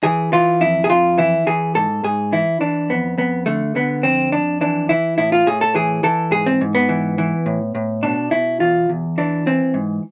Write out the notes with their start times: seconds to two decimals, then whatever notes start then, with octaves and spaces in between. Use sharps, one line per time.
0.03 E3 G#4
0.33 E3 F4
0.61 F2 E4
0.84 G#4
0.89 F2 F4
1.18 E3 E4
1.47 E3 G#4
1.75 G#2 A4
2.04 G#2 G#4
2.32 E3 E4
2.60 E3 D4
2.89 F2 B3
3.18 F2 B3
3.46 D3 A3
3.75 D3 B3
4.03 F2 C4
4.32 F2 D4
4.61 E3 D4
4.89 E3 E4
5.18 A2 E4
5.32 F4
5.47 A2 G#4
5.61 A4
5.75 E3 G#4
6.03 E3 A4
6.31 G#2 G#4
6.46 C4
6.61 G#2
6.75 B3
6.89 E3
7.18 E3
7.46 A2
7.75 A2
8.03 B2 D4
8.31 B2 E4
8.60 E2 F4
8.89 E2
9.18 E3 D4
9.46 E3 C4
9.74 G#2